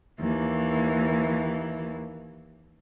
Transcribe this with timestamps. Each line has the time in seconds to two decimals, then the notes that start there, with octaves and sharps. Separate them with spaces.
0.20 D#2 E3